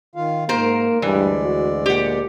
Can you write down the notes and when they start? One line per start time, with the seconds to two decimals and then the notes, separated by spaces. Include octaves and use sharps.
0.15 D#3 F4 F5
0.49 G#2 A#3 A#4 C5
1.02 D2 G2 E3 G#3 D5
1.45 F#4
1.86 A#2 G4 F#5